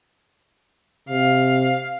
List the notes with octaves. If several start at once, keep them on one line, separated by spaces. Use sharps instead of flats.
C3 F5